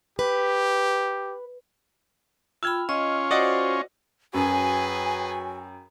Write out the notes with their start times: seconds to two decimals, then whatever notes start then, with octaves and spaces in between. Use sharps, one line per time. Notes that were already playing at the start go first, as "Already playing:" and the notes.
0.19 G4 B4
2.63 F4 G5 B5 E6 F6 G#6
2.89 C#4 F4 D#5 C#6
3.31 F#4 C5 D5 D#5 F#5
4.34 F#2 F#3 F#4 G#4 B4 G5 G#5